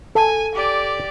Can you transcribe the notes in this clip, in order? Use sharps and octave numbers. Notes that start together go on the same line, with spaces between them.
A4 G#5
G4 D5